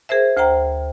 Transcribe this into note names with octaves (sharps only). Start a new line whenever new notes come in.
G#4 A#4 C5 E5
D2 C5 G5 A#5